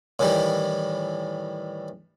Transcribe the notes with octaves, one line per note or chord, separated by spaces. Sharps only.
A2 D#3 E3 G3